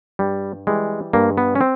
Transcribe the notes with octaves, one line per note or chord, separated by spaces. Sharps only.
G2 G3
E3 G3 G#3
G2 A#3
B3
C#4
C4